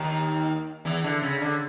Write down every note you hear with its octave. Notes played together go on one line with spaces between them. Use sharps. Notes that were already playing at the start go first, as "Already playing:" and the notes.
Already playing: D#2 D#3
E2 E3
D3
C#3
D3